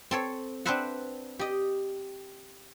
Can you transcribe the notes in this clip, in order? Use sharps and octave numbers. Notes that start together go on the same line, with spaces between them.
C4 A4 C#5
C4 D4 B4 C5 E5 F#5
G4 D#5